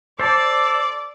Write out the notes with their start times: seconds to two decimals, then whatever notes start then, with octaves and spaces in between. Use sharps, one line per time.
0.20 A4 C5 D5 A5 D6